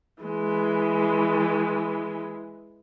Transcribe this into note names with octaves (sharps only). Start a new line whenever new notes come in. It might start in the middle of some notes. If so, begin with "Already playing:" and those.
E3 G#3